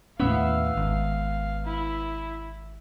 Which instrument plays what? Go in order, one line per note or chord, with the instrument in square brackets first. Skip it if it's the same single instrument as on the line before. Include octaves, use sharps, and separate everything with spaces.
[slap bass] D#2 A2 C#4 [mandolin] B3 E5 E6 [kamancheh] F5
[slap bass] G#1
[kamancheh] E4